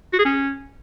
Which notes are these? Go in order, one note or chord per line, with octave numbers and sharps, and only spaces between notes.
F#4
G#4
C#4